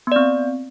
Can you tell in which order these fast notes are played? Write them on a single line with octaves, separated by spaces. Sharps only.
B3 D5 C4